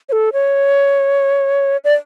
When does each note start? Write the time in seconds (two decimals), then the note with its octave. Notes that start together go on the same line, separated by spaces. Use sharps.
0.09 C#5
0.12 A4
0.33 C#5
1.84 D5